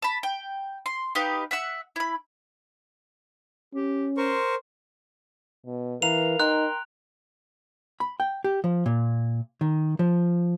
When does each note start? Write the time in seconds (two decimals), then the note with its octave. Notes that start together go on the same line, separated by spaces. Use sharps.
0.02 A5 B5
0.23 G5
0.86 C6
1.15 D#4 G4 B4 F5
1.51 E5 F#5 E6
1.96 E4 B5
3.74 C#4 G4
4.17 A#4 C5 C6 C#6
5.66 B2
6.02 E3 A#4 B4 F5 A#5 F7
6.40 D#4 G5 A#5 C6 F#6
8.00 B5
8.20 G5
8.44 G4
8.64 F3
8.86 A#2
9.61 D#3
9.99 F3